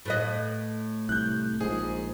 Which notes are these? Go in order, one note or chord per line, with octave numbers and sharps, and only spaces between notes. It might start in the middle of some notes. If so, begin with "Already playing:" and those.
A2 B4 D#5
C2 F#6 G6
A#1 G#2 G#4